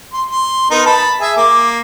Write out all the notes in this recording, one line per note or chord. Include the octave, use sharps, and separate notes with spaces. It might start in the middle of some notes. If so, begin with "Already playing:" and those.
C6
C6
B3 D#4 A#4
A5 B5
G#4 E5
A#3 D6